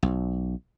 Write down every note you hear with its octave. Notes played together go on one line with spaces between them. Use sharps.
B1